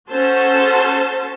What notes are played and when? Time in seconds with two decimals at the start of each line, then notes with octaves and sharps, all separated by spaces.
0.10 C#4 F#4 A4 C5 A5